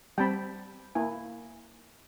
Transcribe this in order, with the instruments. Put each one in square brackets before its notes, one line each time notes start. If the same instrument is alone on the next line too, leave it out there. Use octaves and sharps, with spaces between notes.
[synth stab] G3 C4 [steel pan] G5 A5 B5
[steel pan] A#3 E4 G#5